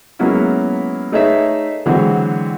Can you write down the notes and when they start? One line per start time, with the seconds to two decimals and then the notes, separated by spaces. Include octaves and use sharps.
0.19 F#3 G#3 A#3 B3 C#4 E4
1.12 A3 D#4 G#4 B4 C#5 E5
1.86 D3 E3 F#3 G#3 C4 F#4